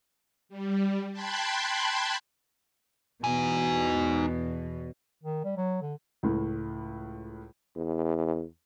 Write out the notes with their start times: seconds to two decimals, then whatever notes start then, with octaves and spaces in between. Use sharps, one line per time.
0.49 G3
1.12 G5 A5 B5 C6 F#6 G#6
3.24 E2 B2 D#4 G#5
5.23 D#3
5.44 G3
5.57 F#3
5.82 D3
6.23 C#2 A2
7.76 E2